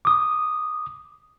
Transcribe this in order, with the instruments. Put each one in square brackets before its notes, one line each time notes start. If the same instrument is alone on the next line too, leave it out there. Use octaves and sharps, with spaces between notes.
[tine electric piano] D6 D#6